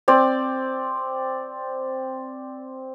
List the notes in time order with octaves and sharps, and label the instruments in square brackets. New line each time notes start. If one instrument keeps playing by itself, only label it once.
[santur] C4 D5